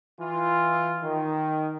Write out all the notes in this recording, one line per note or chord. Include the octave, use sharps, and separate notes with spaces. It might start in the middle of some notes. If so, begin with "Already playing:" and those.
E3 F4
D#3